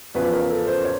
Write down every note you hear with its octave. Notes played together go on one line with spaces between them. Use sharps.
E2 C#3 F3 B4
A#4
A4
C5
C#5